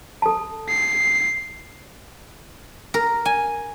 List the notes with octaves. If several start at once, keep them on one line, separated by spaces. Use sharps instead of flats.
A4 A5
C7
A#4
G#5